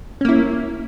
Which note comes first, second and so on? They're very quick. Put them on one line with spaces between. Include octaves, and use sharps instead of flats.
C#4 A#3 E4